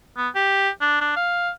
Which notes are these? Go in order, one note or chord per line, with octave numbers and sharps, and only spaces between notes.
B3
G4
D4
D4
F5